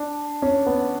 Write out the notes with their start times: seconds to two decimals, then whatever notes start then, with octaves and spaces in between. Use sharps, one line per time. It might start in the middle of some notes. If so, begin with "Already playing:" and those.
Already playing: D4
0.42 C#4
0.66 B3